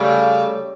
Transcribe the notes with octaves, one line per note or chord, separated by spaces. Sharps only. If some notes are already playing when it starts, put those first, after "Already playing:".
Already playing: C#3 G3 A3